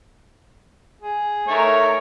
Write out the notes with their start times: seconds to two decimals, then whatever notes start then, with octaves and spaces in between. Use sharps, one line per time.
1.02 G#4
1.48 A3 D#4 A#4 C#5